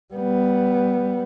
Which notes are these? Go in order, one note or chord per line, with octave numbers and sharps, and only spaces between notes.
G3 B3